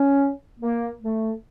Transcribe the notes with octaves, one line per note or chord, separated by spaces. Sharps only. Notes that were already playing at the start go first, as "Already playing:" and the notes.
Already playing: C#4
A#3
A3